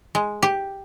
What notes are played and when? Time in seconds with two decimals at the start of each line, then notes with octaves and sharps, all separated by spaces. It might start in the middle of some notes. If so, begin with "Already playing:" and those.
0.15 G#3
0.43 G4